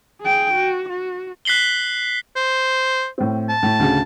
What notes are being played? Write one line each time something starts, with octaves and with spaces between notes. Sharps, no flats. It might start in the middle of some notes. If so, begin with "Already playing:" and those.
G#4 G5
F#4
F#4
F#6 B6 C7 F#7 G7
C5
A2 C4
A5
A2
D2 C#3